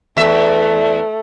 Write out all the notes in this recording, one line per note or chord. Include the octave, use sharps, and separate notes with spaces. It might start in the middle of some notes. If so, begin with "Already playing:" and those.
E2 A3 E5